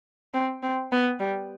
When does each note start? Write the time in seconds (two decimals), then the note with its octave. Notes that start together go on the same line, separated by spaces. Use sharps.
0.34 C4
0.63 C4
0.92 B3
1.20 G3